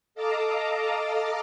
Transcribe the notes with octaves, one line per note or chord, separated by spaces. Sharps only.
A4 D#5 F5 A5 A#5 D6